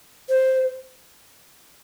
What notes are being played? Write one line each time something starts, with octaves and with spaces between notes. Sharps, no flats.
C5